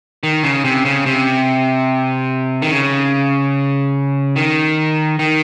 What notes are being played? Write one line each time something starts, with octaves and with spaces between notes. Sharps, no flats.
D#3
C#3
C3
C#3
C3
D#3
C#3
D#3
D#3